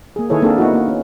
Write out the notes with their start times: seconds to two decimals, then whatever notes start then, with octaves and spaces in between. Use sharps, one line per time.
0.16 A#3 G#4
0.30 D#3 E4 G#4 A4 B4 C#5
0.42 A#3 C4 D4 G#4 A4
0.58 A#3 B3 D#4 E4 F#4
0.73 A#3
0.88 C#4